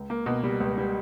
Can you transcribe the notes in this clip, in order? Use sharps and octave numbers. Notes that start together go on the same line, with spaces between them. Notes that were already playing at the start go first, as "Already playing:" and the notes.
Already playing: C#2
A#3
B2
G3
C#2
G3